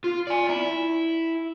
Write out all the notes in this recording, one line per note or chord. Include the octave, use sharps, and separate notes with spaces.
F4
D5 G#5
E4